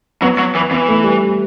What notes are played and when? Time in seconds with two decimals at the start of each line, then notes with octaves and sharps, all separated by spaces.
0.22 F#3 B3
0.38 F#3
0.55 E3
0.71 E3 B3
0.88 A3
1.04 G3